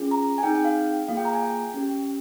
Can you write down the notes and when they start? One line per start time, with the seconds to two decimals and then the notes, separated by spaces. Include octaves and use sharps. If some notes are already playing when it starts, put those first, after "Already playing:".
Already playing: C#4 F4 G#4
0.11 A#5
0.38 G#5
0.43 C4 D#4 G#4 G5
0.55 G5
0.65 F5
1.08 A#3 F4 G#4 F5
1.17 G5
1.25 A#5
1.33 G#5
1.42 G5
1.74 C#4 G4